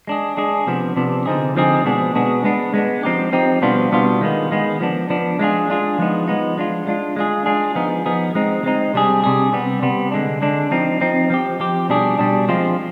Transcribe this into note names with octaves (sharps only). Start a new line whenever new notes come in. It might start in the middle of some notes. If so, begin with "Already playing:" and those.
G#3 D4 G#4
G#3 D4 G#4
C3 F3 B3 D4
C3 F3 B3 D4
D3 F3 C4 D#4 G#4
D3 F3 C4 D#4 G#4
B2 G#3 B3 D4 G#4
B2 G#3 B3 D4 G#4
G#3 B3 D4
G#3 B3 D4
F3 C4 D#4 G4
F3 C4 D#4 G4
B2 G3 B3 D4 F4
B2 G3 B3 D4 F4
D#3 G#3 B3
D#3 G#3 B3
F3 B3 D4
F3 B3 D4
G#3 D4 F4 G#4
G#3 D4 F4 G#4
F3 G#3 B3 D#4
F3 G#3 B3 D#4
G#3 D4 F4
G#3 D4 F4
G#3 D4 F4 G#4
G#3 D4 F4 G#4
F3 B3 D#4 G#4
F3 B3 D#4 G#4
G#3 C4 D#4
G#3 C4 D#4
C3 G3 D4 G#4
C3 G3 D4 G#4
C3 G3 B3
C3 G3 B3
D3 G#3 D4
D3 G#3 D4
F3 C4 D#4
F3 C4 D#4
F3 C4 G4
F3 C4 G4
B2 G3 D4 G#4
B2 G3 D4 G#4
F3 G#3 C4 F4